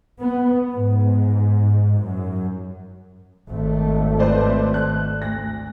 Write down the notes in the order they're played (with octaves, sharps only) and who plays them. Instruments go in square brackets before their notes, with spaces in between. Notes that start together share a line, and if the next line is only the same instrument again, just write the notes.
[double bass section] B3
G#2
F#2
G#1 A3
[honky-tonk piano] B4 C5 D5
F#6
D2 A#6